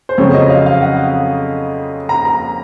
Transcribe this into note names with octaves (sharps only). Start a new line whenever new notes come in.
C5
F2 C#3 F#3 C4 C#5
D#5
F5
F5
F#5
A#5
A#5